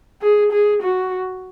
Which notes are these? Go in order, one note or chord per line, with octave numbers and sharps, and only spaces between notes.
G#4
G#4
F#4